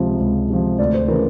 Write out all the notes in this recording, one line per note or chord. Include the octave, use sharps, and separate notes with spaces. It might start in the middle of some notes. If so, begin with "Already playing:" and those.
Already playing: C#2 C3 F3
C#2
C3 F3
D2 D5
C5
C#3 E3 A#4